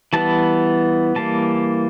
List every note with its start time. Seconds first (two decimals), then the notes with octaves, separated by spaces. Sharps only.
0.13 E3 G3 B3 A5
1.15 E3 G3 A#3 A5